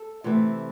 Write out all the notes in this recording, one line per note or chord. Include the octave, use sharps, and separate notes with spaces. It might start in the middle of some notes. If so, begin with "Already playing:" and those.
Already playing: A4
C3 E3 A3 C4